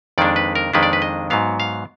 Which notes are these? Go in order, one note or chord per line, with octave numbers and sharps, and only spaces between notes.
F2 D#3 G#3 D4 D5
B4
A#4
F2 D#3 G#3 D4 B4
D5
B4
D#5
G#2 F#3 B3 F5
F5